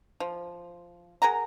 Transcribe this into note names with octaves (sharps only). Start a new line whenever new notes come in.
F3
G#4 A#4 F#5 A#5